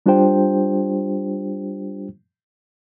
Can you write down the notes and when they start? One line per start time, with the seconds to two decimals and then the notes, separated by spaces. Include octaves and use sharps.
0.06 G3 D4 F4 G4 C5 G5